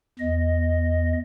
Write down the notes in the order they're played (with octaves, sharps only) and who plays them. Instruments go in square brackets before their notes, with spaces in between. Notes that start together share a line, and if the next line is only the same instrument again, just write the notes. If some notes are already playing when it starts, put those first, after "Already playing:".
[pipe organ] E2 D#5